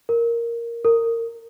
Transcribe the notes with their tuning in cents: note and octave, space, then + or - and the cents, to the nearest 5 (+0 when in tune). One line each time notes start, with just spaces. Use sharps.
A#4 +0
A#4 -20